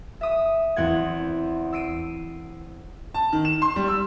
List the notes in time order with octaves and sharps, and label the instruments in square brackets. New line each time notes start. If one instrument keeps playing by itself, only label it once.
[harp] E5 D#6
E2 C4 F#5 G#6
E6 C7 D7 D#7
[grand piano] A5
D#3
E7
C6
G3
E6